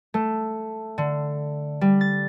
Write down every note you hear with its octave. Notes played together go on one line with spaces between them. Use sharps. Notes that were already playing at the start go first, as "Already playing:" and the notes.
A3
D3
G3
A6